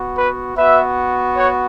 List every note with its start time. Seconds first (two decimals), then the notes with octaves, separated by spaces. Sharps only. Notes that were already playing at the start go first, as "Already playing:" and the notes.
Already playing: B3 F#4
0.15 B4
0.55 B3 F#4 B4 E5
1.36 C#5 F#5